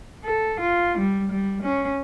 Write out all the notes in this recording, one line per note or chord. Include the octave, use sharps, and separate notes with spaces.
A4
F4
G3
G3
C#4